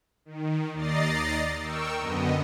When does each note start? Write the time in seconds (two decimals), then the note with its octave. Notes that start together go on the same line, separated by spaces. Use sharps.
0.25 D#3
0.73 D#2 D5 D#5 A#5 A6 C7
1.61 A#4 G5 C#6 E6
1.98 F#2 D3 B3 D#5